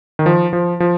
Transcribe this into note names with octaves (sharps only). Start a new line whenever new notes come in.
D#3
F3
F3
F3